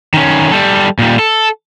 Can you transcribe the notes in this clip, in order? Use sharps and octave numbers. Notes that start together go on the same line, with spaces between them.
D#3 C#4
G3 A4
A#2 G3
A4